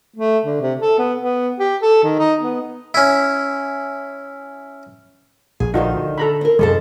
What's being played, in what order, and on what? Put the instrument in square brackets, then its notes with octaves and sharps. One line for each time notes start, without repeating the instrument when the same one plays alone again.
[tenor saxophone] A3
D3
C3
A4
B3
B3
G4
A4
D#3
D#4
B3
[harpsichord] C#4 E4
[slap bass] A#1 [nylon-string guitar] G#4
[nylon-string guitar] D2 D#3 C5 [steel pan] D#4 F4 F#4
[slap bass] D3
[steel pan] A4 A#5 B5
[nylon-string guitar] C4 A#4
[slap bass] F#2 C3 D#3 [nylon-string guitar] F3 A4 C5 [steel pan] G#3 A5